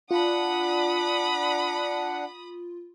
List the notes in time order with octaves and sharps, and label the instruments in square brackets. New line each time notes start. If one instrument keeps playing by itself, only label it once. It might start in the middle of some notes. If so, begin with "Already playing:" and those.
[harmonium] D4 F#5 [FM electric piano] F4 [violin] B5 D#6